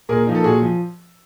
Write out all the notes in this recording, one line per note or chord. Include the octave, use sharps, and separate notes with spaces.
A#2 G#4 A#4
F3 A#3 D#4
A4
A#2 F#4 G#4
F3